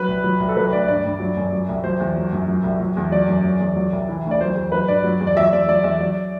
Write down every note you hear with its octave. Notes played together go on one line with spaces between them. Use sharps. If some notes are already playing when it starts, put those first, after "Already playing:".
Already playing: F#3 B4
C2
F#3
C2
A4
F#3 B4
D2 D5
G2 D5
G2
F#3
F#2
F#3
C2
F#3 C5
E2
F#3
F#2
F#3
C2
F#3
E2
F#3 D5
F#2
F#3
E2
F#3
C2
E3
D2
D5
F#3 C5
E2
F#3 B4
G2 D5
F#3
E2
D5
F#3 E5
E2 D5
F#3 D5
E2 E5
F#3 D5